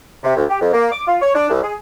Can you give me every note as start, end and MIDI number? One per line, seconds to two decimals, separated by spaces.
0.24 0.35 48
0.36 0.45 38
0.50 0.58 67
0.61 0.73 41
0.73 0.88 58
0.92 1.03 86
1.07 1.16 65
1.22 1.31 73
1.35 1.47 62
1.50 1.60 36
1.63 1.75 68